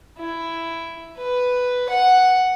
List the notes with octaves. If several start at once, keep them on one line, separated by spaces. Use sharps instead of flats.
E4
B4
F#5